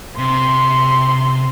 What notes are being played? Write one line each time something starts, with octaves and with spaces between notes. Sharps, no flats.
C3 C6